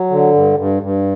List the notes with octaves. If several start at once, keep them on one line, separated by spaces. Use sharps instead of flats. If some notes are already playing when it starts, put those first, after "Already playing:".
Already playing: F#3
D3
G2
G2
G2